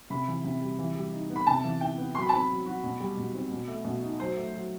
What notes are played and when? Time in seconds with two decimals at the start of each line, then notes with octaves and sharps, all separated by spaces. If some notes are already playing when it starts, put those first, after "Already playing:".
0.10 C3 B5
0.28 E3
0.44 C3
0.62 G3
0.79 E3
0.95 G3
1.12 D#4
1.30 B3
1.36 B5
1.47 C3 A5
1.64 E3
1.81 E4 G5
1.98 B3
2.15 F#3 C6
2.22 B5
2.29 A5
2.32 C4 B5
2.49 F#3
2.66 F#4
2.84 B2
3.01 G3
3.17 B2
3.35 C4
3.51 B2
3.68 A3
3.85 B2
4.02 D#4
4.20 F#3 C5
4.37 A3
4.54 F#3